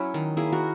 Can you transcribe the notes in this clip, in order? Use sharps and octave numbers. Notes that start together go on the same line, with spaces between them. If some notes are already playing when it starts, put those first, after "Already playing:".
Already playing: F#3 C#4 E4 F#4
D#3
A#3 E4 G#4
F#4 A#4